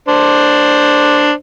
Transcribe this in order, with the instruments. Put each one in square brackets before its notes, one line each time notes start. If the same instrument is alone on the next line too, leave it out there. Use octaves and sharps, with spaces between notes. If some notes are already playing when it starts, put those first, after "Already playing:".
[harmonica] D4 C5